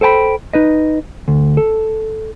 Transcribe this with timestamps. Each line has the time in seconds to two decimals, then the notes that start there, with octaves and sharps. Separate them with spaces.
0.01 A4 C5 G5 A5 B5
0.53 D#4 B4 D#5
1.28 D2
1.57 A4